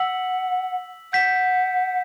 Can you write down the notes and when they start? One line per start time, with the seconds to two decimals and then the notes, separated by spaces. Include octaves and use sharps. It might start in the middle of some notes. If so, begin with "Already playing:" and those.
Already playing: F#5 E6 B6 F#7
1.13 F#5 G6 B6 E7